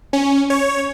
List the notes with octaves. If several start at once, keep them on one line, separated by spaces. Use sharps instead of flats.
C#4
C#5